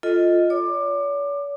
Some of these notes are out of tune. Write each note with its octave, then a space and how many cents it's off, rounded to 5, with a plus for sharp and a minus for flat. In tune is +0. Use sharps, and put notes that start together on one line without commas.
F4 +0 A4 +0 D#5 +5
C#5 +45 D6 +20